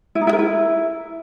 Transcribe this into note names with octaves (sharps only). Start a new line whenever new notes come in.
E4
D#4
E4
A#4
E4